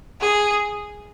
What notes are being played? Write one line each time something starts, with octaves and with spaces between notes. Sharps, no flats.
G#4